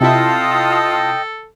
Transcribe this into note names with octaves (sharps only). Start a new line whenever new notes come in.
C3 E4 F4 A4 D#5 G5 A5 D#6